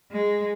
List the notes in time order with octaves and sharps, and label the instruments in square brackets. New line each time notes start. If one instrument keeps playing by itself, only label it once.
[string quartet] G#3